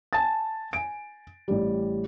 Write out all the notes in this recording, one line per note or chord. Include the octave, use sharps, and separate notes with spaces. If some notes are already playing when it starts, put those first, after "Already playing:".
G#5 A5 A6
G#5 D7
A1 G3